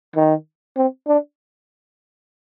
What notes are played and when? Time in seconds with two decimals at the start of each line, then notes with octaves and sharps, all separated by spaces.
0.16 D#3
0.77 C4
1.08 D4